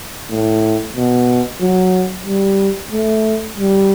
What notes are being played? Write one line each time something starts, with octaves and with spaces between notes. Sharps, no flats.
A2
B2
F#3
G3
A3
G3